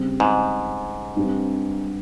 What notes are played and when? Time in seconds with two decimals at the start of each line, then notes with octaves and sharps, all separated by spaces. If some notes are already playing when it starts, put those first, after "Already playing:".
Already playing: C#3 G3 C4
0.20 G#2
1.16 G2 G3 C4